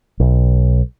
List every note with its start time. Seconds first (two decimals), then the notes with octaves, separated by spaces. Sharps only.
0.20 B1